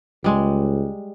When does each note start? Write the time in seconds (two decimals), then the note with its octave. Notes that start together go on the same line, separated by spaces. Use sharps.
0.24 C#2 G3 G#3